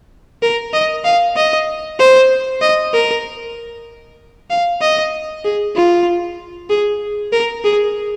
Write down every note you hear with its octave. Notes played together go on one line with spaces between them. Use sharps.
A#4
D#5
F5
D#5
C5
D#5
A#4
F5
D#5
G#4
F4
G#4
A#4
G#4